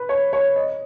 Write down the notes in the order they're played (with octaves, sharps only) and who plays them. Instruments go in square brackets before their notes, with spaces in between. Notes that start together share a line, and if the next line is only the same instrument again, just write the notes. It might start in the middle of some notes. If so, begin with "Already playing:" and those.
Already playing: [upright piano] B4
C#5
C#5
D#5